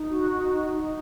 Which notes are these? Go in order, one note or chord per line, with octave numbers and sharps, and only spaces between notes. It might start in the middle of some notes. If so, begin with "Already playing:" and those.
Already playing: D#4
F#4
D#4
D#4
D#4